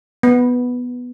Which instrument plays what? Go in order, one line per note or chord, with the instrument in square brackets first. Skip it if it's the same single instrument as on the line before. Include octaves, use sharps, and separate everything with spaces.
[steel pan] B3